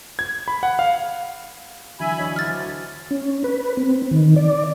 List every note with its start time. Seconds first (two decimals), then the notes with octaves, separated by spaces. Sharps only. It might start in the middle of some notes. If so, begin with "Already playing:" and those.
0.19 G#6
0.48 B5
0.63 F#5
0.79 F5
2.00 D3 E3 F#3 E5 G#5 B5
2.18 D4 C#5 D#5
2.36 D2 E4 F#4 F6 A6
3.11 C#4
3.44 B4
3.77 C4
4.11 D#3
4.36 D5